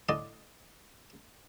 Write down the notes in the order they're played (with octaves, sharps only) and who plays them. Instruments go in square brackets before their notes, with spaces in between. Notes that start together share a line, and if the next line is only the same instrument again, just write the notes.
[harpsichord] A2 D3 D5 D#5 C6